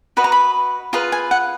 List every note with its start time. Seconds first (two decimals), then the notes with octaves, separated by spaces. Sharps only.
0.17 F#4 B4 D#5 B5
0.24 A#5
0.32 B5
0.93 F4 G#4 B4 A#5
1.12 G#5
1.31 F#5